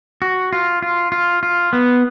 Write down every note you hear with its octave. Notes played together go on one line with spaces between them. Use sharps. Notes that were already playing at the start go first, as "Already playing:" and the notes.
F#4
F4
F4
F4
F4
B3